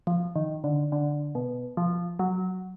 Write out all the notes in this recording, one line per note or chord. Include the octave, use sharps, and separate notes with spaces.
F3
D#3
D3
D3
B2
F3
F#3